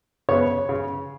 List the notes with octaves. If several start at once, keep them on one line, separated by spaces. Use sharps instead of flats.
C#3 B3 C#5
C#3